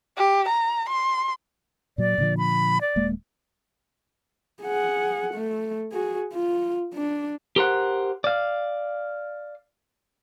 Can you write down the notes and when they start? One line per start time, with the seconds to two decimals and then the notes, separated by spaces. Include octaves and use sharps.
0.17 G4
0.48 A#5
0.89 C6
1.98 A#2 F#3 D5
2.18 A#2 D3 F3
2.38 B5
2.81 D5
2.96 D#1 G#3 A#3
4.63 G#4 F#5
5.34 A3
5.92 F#4 G#4
6.33 F4
6.94 D4
7.56 G4 A#4 C5 F#5
8.24 D5 F5